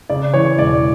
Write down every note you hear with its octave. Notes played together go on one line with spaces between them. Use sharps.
C#3 D5
E3 C#5
E1 D5